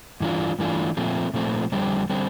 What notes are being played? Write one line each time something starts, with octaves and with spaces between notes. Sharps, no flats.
G2 E3 A3 D4 F4
G2 E3 A3 D4 F4
A#2 F3 A3 C4
A#2 F3 A3 C4
F2 D3 G3 C4
D3 G3 C4